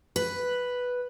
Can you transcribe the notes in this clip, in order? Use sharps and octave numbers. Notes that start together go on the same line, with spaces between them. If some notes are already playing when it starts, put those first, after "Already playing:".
B4